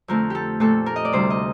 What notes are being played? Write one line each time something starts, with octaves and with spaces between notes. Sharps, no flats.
F2 D3 A3 C4 A#4
G4 A4
A#2 A3 C4 A4
A#4
D#5
D5
D2 C3 G3 C5
D#5